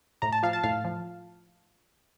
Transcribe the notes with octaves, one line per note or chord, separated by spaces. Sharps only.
A2 A#5
A5
F3 F5
A5
A2 F5
F3